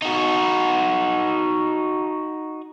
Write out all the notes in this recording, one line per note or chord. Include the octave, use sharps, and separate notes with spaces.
D#4 F#4